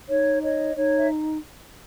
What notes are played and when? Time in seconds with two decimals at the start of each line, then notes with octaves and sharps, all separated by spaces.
0.09 D#4 C#5
0.42 C#5 D#5
0.76 D#4 C#5
0.98 E5